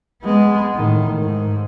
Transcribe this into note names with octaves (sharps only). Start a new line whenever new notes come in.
G#3 B3
A2 D#3
G#2